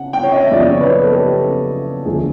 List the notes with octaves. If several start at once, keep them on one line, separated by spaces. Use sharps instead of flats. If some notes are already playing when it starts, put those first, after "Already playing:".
Already playing: C#3 F#5
G5
C#5
D#5
E5
F#1 E2 C#3 F3 D5
D#5
C#5
B4
A4
G4
E1 D2 D3 F3 G#4